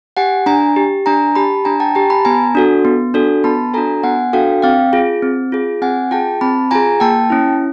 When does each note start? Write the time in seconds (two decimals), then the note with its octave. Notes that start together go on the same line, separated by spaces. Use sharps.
0.17 G4 F#5 G#5
0.46 D4 G#5 A#5
0.76 G4
1.06 D4 G#5 A#5
1.35 G4 A5 B5
1.65 D4 G#5 A#5
1.80 G5 A5
1.95 G4 G#5 A#5
2.10 A5 B5
2.25 B3 G#5 A#5
2.55 D4 F#4 A4
2.85 B3
3.14 D4 F#4 A4
3.44 B3 A5 B5
3.74 D4 F#4 A4 G#5 A#5
4.03 B3 F#5 G#5
4.33 D4 F#4 A4 F5 G5
4.62 C4 F5 G5
4.93 F4 G#4
5.22 C4
5.52 F4 G#4
5.82 C4 F#5 G#5
6.11 F4 G#4 G5 A5
6.41 C4 A5 B5
6.71 F4 G#4 G#5 A#5
7.00 A#3 G5 A5
7.30 C#4 E4